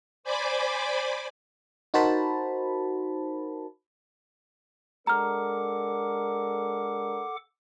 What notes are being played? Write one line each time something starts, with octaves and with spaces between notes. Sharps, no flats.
C5 D5 G#5 B5 D6
D#4 F#4 A#4 C5 A5 B5
G#3 D4 A4 A#4 F#5 A#5 D6 F6